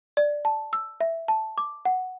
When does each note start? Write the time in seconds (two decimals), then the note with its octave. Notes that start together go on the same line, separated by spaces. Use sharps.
0.17 D5
0.45 A5
0.73 E6
1.01 E5
1.28 A5
1.58 D6
1.85 F#5